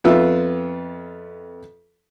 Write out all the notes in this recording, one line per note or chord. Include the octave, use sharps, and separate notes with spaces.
F2 B3 F4 E5